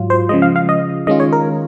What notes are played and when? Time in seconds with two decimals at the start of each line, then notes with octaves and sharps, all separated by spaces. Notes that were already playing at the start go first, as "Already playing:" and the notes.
Already playing: G#2 F#3 F4
0.10 C5
0.29 C#3 F3 G#3 D#5
0.42 F5
0.56 F5
0.69 D#5
1.07 D#3 G#3 C#4 F4 D#5
1.20 C#5
1.32 A#4